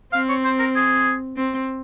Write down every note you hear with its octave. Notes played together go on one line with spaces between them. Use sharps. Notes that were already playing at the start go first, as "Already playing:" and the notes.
C4 F5
C#5
C5
A#4
G#4
C4